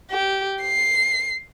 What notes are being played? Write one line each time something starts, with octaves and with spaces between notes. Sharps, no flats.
G4
C7